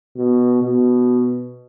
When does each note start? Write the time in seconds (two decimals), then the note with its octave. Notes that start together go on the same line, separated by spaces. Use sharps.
0.16 B2
0.63 B2